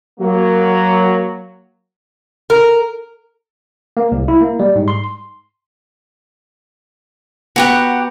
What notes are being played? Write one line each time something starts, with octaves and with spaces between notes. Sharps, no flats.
F#3 A#3
A#4
A#3
C2
E4
A#3
G3
G#2
C6
B3 F#4 G4 F#5 A#5